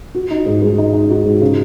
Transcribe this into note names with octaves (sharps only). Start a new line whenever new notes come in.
F#4
D#4
G#2
G#3
D#4
D#4
F#4
G#2
C#3